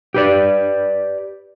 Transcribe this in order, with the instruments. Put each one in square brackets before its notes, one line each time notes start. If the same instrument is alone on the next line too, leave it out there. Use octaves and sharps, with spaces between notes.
[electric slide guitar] G4 B4 D5